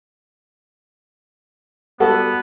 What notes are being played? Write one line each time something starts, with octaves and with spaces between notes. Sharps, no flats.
G3 B3 F#4 A4